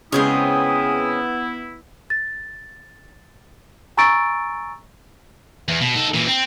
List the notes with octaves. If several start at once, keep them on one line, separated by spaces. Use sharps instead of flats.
C#3 G#3 B3 C4 E4 G#4 C#5 D#6
A6
G#5 A#5 C#6 E6 A6 D7
E2
B2
D#4 A4
A#2 E3
C4